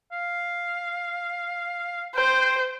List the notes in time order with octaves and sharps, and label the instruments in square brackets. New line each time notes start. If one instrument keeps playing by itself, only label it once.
[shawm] F5
[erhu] C5 [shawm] G5